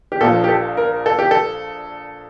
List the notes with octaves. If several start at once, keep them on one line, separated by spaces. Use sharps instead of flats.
G4
A#1 A#2 F3 A4
G4
A4
A#4
A4
G4
A4